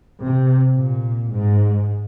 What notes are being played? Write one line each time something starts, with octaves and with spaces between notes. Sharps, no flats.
C3
A#2
G#2